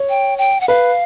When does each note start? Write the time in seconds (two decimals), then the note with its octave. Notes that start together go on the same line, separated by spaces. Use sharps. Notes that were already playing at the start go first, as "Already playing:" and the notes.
Already playing: C#5
0.09 G5
0.38 G5
0.61 F#5
0.68 B4 F5